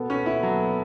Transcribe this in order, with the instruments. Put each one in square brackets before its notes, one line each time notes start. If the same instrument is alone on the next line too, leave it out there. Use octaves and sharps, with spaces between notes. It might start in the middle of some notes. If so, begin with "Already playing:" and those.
Already playing: [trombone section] B2 B3 A4
[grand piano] C#4
E4
F#3